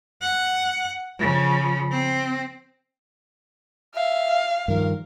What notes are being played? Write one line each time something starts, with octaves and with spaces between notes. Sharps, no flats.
F#5
C#3 F3
C4
E5 F5
G2 D#3 F3 A#4